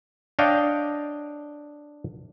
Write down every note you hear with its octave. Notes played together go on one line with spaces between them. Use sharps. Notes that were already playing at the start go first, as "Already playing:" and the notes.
D4 C#5 D#5 F5 G5